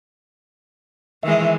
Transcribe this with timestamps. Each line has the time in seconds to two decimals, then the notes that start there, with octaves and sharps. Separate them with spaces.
1.23 D#3 E3 G#3 E5